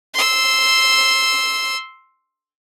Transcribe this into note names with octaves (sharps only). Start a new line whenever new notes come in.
C6 E6